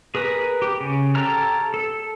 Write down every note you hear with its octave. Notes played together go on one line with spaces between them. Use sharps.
G#4 A#4 B4 D#6
G4
C#3
G4 A4 C#5 A#5 F6
A4